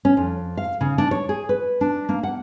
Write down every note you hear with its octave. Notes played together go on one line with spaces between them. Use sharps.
C#4
F2
F5
C#3
D4
C#5
G#4
B4
D4
A#3
F#5